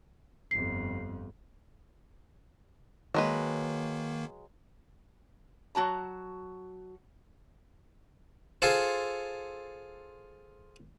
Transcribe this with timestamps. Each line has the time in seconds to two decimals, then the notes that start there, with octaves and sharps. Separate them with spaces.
0.51 G1 F2 C7
3.14 D#3 F#3 G#3 A#3 B4
5.75 F#3 F#4 A5 A#5
8.62 F4 G#4 A4 C5